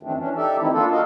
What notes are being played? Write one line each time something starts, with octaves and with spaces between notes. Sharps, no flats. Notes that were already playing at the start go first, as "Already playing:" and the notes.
F#2 D#3 E3 A3 C4 D4
E3 C#4 D4
D#4 G4 A4 D5 E5
D#3 E3 A3 C4 D#4 E4
A#3 D4 F4 A4
F#4 A4 A#4 D#5 F5